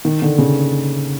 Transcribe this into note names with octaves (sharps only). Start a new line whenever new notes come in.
D#3
D3
C#3